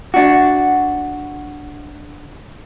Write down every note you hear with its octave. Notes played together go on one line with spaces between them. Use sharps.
D4 F#4